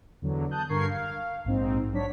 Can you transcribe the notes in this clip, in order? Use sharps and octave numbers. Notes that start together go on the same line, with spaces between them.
E2 D3 F#3
A5 D#6 F#6 G6
G2 D3 A#4 C#6 G#6 C7
F5
A#1 G#2 C4 D#4
F#3 D4 C#5 B6